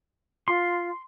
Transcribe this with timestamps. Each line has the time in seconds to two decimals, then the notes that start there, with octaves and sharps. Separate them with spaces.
0.48 F4 C6